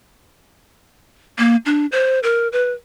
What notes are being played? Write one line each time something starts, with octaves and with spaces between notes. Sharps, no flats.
A#3
D4
C5
A#4
B4